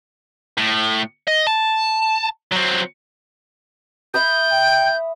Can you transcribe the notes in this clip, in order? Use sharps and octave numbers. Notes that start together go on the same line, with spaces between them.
A2
D#5
A5
F#3 C4
E5 B5 D#6 G6
G5